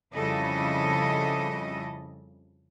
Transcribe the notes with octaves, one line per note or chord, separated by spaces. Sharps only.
F2 C#3 G3 E4 A4 D#5